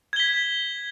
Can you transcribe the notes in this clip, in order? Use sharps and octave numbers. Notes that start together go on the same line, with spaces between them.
G#6 B6 G7